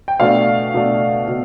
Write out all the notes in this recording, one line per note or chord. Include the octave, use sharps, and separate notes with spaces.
G5
B2 A3 D4 F5
B2 A3 D4
B2